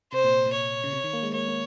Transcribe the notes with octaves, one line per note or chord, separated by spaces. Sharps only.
C3 C5
A#2
A#2
C#5
C#3
C3
D#3
A#3
G#3
A#3 C#5
A#3